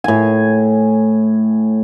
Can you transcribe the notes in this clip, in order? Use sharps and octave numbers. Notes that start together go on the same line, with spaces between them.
A2 G#5